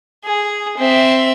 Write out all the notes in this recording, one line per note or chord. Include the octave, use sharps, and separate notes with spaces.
G#4
C4 E5